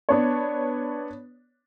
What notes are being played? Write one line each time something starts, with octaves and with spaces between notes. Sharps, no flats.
B3 D4 C#5